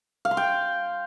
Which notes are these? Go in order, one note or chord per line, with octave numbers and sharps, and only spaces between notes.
F5
C6
G5